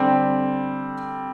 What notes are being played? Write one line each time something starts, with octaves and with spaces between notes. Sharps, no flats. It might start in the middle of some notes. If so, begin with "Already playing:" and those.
Already playing: D3 G3 C4